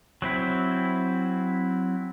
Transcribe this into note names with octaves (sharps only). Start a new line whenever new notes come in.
F#3 C4 E4